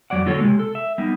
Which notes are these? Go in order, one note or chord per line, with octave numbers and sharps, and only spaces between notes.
F2 F#3 C#5 D5 F#5
D3 A#3 F4 F#4 A4 C#5
C3 G#3
A4
E5
G3 A#3 B3 D#4